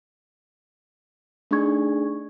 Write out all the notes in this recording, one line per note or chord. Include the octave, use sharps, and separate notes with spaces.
A3 D4 D#4 G#4 C#6 G#6